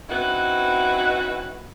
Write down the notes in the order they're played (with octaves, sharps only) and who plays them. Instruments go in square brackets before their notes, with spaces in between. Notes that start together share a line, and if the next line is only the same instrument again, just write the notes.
[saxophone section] C4 C#4 D#4 E4 F#4 B4